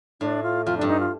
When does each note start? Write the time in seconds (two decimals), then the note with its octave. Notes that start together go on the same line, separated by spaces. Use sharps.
0.21 A2 D4
0.43 F4
0.66 F2 F4
0.77 G2 D4
0.88 D#4
1.00 F4